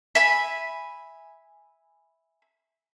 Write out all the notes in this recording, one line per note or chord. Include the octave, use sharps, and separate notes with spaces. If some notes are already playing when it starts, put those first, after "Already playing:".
E5 G#5 B5